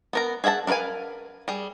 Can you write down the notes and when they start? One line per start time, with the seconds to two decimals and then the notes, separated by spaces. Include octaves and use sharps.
0.13 B3 A#4 A#5
0.44 G#4 E5 F#5 G5 A5
0.67 D4 A#4 B4 F5 G#5
1.48 G3 G#4